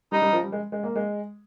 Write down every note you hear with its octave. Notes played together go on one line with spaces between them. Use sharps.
G3 D#4
G3
F3
G3
G#3
G#3
A#3
G#3